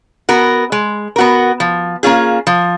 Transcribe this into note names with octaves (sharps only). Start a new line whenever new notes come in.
B3 F#4 A#4
G#3
B3 F#4 A#4
F3
A#3 C#4 F4 G#4
F3